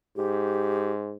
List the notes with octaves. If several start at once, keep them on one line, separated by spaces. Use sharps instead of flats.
G#2 G4